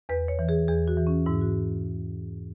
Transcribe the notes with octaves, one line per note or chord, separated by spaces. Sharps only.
E2 B4
C#5
E3
G#4
E2 G#4
F#4
E3
C#4
G#2 E4
F#4